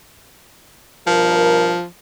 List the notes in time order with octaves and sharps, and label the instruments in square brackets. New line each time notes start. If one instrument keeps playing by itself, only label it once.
[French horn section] G2 B2 A#4 [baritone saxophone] F3